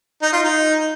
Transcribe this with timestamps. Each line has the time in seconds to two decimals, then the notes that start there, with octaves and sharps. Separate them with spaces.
0.22 D#4
0.33 F4
0.43 D#4